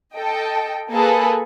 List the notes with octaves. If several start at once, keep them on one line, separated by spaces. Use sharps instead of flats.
A4 D#5 G5
A#3 G#4 A4 B4